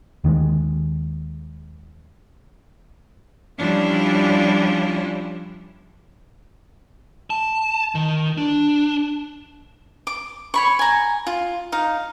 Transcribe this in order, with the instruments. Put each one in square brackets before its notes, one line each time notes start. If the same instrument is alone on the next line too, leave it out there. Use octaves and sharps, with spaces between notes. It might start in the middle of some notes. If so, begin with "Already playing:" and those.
[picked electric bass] D#2 D#3 E3 G#3
[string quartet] F3 G3 C#4 D4 E4 F4
[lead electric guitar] A5
D#3
D4
[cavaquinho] D6
C#5 B5 C#6
G#5 A#5
F4
D#4 F5